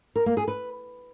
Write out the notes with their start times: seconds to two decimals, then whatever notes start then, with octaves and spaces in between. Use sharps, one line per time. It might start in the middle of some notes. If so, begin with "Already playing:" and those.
0.16 A#4
0.26 A#3
0.37 G#4
0.48 B4